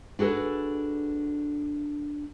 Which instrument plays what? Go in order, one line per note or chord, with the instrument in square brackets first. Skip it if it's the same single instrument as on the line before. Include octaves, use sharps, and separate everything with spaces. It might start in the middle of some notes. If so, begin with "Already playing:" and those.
[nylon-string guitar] D4 F#4 G#4 A4 B4